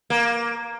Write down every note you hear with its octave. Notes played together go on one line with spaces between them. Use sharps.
A#3